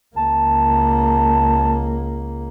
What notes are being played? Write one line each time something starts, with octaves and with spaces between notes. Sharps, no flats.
C#2 A#3 A5